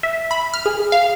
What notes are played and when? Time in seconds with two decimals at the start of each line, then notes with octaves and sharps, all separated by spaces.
0.03 E5
0.31 B5
0.54 F6
0.66 G#4
0.92 F5